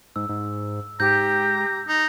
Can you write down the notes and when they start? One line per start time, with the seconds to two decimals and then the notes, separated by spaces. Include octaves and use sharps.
0.16 G#2 E6
0.29 G#2
1.00 G#2 G4 A#5 G6
1.87 D#4